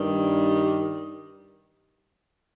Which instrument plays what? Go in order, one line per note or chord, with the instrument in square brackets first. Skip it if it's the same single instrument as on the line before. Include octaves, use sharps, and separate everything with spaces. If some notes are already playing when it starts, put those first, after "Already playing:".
Already playing: [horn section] G2 D#3 G3